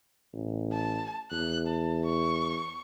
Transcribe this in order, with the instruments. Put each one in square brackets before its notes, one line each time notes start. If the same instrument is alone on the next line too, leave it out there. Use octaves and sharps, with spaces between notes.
[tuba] A1
[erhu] A5
[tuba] E2 [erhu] F#6
[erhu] A5
C#6